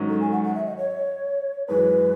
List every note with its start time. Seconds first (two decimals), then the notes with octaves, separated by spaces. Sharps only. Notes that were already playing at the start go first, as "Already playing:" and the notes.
Already playing: G#2 D#3 F#3 C#4
0.09 A4
0.20 G#5
0.32 F#5
0.43 F#5
0.55 E5
0.66 D#5
0.77 C#5
1.68 F#2 E3 G#3 B4